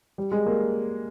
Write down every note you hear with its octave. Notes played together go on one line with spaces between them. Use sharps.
G3
G#3
A#3